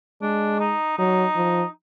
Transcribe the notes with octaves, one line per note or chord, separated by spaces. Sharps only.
G#3 D4
D#4
F#3 D#4
F3